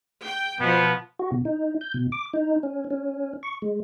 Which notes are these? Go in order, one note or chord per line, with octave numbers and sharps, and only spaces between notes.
G5
B2 F3 B3
F#4
B2
D#4
G6
B2
D6
D#4
C#4
C#4
C#6
G#3